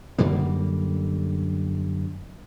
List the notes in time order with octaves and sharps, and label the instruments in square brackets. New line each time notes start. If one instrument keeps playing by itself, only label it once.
[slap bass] F#2 D3 G3 A#3